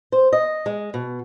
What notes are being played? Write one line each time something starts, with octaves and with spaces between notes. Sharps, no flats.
C5
D#5
G#3
B2